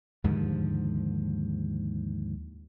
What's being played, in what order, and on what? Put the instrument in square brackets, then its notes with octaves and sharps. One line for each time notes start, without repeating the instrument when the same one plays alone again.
[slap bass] D#2 G#2 D3 F3